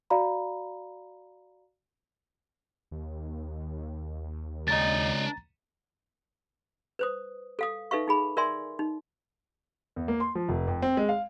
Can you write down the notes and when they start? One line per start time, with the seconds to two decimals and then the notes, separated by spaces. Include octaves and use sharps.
0.10 F#4 D5 F5 A#5 B5
2.91 D#2
4.68 C#2 D4 D#5 A#5 A6
6.99 B4 C5 D#6
7.59 A4 F5 D#6
7.91 D#4 A4 B4 E5 F5 C#6
8.08 D#4 G#4 B5
8.37 A#4 D5 E5 G#5 C6
8.79 D#4
9.96 E2
10.08 A#3
10.20 C6
10.35 F3
10.49 F1
10.67 F2
10.82 C4
10.97 G#3
11.09 F5